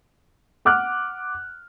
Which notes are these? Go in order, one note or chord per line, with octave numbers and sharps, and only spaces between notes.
F#5 D6 F6 F#6